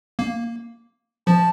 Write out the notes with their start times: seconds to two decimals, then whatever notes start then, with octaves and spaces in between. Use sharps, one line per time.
0.19 A#3
1.27 F3 A5